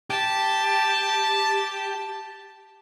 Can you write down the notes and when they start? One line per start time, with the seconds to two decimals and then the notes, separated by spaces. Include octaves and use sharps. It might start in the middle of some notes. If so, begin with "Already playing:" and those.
0.10 G4 A5